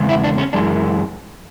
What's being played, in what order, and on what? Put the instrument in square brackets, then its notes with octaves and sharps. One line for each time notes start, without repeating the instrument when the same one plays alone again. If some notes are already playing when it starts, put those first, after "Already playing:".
Already playing: [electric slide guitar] E2 C#3 G#3
E4
D4
C#4
F#2 E3 G#3 D4